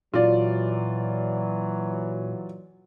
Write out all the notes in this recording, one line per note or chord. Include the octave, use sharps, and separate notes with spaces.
A#2 E3 F#3 F4 D5